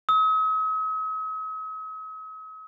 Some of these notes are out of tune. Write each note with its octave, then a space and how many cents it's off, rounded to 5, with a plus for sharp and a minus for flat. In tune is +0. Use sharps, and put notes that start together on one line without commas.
D#6 +45